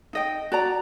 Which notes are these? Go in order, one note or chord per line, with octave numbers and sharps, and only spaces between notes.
D#4 D#5 G5
F#4 D5 A#5